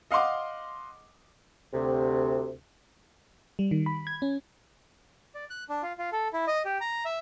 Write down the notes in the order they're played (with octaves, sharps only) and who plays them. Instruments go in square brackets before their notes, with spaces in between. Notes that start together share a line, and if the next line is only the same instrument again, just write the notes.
[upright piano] D#5 F5 F#5 C6 D6
[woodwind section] D2 C3
[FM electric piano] G3
D#3
B5
G#6
C#4
[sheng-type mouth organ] D5
F#6
D4
F4
F4
A4
E4
D#5
G4
A#5
E5